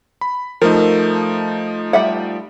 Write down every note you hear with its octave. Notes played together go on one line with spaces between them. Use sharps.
B5
F3 A3 D#4 A#4
G3 E5 F#5